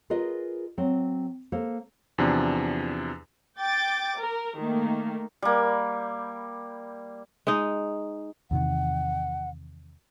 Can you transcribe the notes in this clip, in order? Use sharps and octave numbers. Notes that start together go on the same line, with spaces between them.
F4 G#4 A#4 B4 D#5
F#3 C4
A#3 A4 C5
E2 C3 F3 D4
G5 D6 A6
A#4
D#3 A3 A#3
G3 A#3
G#3 D#4
E2 C3 D#3 F#5